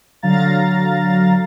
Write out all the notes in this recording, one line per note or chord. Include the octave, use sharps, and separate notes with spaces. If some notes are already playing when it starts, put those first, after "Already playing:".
D3 F#3 F5 A#5 A6